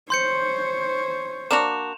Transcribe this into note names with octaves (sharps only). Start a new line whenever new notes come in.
C5 C#5 C6 G6 C#7
A#3 D4 F#4 E7 F7